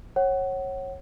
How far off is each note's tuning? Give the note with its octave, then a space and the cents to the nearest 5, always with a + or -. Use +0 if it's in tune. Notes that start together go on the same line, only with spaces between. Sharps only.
C#5 -25 F#5 +25